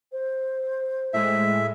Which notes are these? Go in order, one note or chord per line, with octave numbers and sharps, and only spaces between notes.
C5
A2 G#3 E5